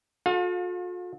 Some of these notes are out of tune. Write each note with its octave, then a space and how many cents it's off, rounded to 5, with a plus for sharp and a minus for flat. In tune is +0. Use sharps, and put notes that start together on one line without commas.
F4 +45 A4 -25 F5 +35